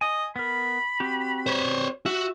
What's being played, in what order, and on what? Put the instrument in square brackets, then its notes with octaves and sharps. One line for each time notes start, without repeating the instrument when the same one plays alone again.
[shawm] D#5 [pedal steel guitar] G#5
[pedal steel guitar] B3 A#4 [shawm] B5
[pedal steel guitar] C4 F#4 G4
[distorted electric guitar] C5 C#5
[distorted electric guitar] F#4 [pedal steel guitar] E5